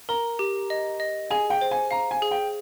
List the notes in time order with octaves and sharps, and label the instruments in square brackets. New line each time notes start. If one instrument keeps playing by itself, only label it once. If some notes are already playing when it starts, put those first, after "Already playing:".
[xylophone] A#4 [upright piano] A#5
[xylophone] G4
D#5
D#5
[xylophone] G#4 [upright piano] G#5
[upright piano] G5
[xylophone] C5
[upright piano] G#5
[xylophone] F5 [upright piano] A#5
[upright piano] G#5
[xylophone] G#4
[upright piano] G5